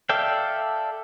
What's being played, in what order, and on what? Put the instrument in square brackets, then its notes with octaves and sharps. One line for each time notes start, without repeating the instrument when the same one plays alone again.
[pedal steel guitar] A4 D5 E5 F5 G5